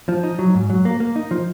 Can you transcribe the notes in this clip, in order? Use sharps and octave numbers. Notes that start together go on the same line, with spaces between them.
F3
D#4
F#3
G#2
F#3
A#3
A#3
D#4
F3